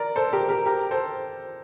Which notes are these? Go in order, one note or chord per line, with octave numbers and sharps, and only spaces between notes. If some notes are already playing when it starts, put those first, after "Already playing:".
Already playing: A#4 D5
A4 C5
G4 A#4
G4 A#4
G4 A#4
A4 C5